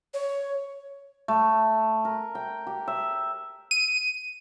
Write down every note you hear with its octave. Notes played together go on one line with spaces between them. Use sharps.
C#5
A3
A#4
G5
G4
E5
D#7